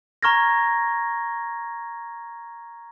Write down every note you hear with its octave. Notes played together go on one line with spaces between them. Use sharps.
A#5 C#6 F6 G#6 A#6